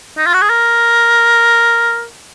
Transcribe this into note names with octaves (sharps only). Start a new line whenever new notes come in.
D#4
F4
F#4
G#4
A#4